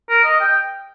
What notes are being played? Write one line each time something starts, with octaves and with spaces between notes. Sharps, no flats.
A#4
D#5
G5